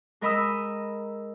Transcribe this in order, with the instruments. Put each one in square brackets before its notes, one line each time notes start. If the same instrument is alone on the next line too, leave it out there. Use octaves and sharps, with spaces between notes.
[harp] G#3 A#4 D#5 B5 D#6 E6